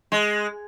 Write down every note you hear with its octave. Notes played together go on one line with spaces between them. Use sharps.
G#3